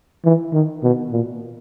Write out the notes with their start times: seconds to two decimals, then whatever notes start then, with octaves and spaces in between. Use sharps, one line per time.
0.25 E3
0.53 D#3
0.83 B2
1.12 A#2